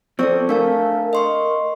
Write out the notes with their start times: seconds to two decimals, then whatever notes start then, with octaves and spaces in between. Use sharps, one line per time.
0.19 F3 C4 A4 D5 C#6
0.49 A3 D4 A#4 F5 A5
1.13 A#4 D#5 C6 C#6